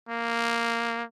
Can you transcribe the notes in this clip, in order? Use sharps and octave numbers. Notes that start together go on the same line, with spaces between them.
A#3